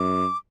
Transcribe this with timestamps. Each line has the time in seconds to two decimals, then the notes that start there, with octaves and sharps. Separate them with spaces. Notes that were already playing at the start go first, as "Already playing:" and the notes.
Already playing: F#2 D6